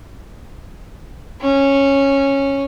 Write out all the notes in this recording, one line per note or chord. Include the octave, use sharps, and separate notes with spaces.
C#4